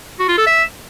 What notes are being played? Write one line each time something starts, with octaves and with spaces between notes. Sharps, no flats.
F#4
F4
A4
E5